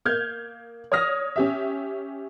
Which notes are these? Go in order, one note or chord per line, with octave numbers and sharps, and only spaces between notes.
A#3 F6 G6 G#6
C#5 D5 D#6 F6 A#6
C#4 G4 E5